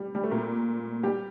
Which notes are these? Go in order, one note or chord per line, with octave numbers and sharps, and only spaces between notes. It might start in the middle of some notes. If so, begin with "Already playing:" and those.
Already playing: G3
G3
A3
A#2 A#3
G3 G4